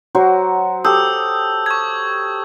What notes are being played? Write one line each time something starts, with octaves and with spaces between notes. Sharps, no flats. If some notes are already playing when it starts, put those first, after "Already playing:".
F#3 F#4 C5
G4 A4 D#6 E6 G6
C#6 G#6